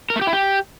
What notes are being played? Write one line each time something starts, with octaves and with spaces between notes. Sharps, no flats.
A#4
A3
G4
E4
G4